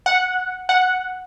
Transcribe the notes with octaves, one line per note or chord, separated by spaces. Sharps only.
F#5
F#5